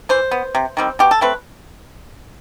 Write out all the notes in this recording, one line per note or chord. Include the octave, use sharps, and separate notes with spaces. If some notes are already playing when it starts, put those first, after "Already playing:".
E3 C5
B3
C3
D#3 G3 C4
B2 G4
A4
A3 C4 B4